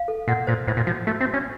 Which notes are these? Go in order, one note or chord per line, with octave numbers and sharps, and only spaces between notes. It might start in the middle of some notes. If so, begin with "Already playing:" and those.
Already playing: F5
A4
A#2 F#5
A#2 C5
A2 C5
A#2
F3 F#4
A3 F#4
C4
F#4
C#4